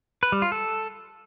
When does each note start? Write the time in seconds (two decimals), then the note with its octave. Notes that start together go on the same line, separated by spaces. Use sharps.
0.23 B4
0.32 G3
0.42 F4
0.52 A4